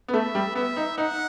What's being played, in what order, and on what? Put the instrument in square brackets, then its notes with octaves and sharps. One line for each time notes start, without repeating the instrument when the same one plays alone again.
[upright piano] B3
[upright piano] A3 [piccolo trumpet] E5
[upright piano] G3
[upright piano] B3 [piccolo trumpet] E5
[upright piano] D#4
[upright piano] D#4 [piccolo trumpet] F#5